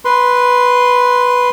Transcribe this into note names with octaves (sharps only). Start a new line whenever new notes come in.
B4 C6